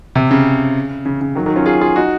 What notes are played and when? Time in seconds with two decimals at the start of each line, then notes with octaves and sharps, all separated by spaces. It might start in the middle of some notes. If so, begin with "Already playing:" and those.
0.15 C3
0.31 C#3
1.06 C#3
1.21 C#3
1.35 D#3 F#3
1.46 D#3 F#3
1.55 C#4 F4
1.66 F4 G#4
1.81 F4 G#4
1.96 D#4 F#4